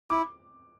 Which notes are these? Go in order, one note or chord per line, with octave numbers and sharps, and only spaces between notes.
E4 D6